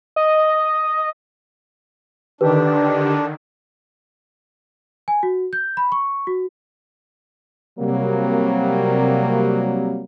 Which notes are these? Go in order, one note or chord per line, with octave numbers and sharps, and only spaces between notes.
D#5
D3 D#3 D4 G4 B4
G#5
F#4
G6
B5
C#6
F#4
C3 F#3 G3 A#3